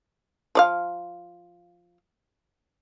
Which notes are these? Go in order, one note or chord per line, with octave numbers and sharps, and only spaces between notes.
F3 D5 F5